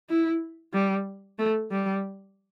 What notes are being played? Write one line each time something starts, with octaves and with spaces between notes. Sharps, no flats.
E4
G3
A3
G3